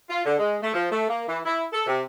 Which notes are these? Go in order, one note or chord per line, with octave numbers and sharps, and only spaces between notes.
F4
D3
G#3
A3
F3
A3
A#3
E3
E4
A4
C3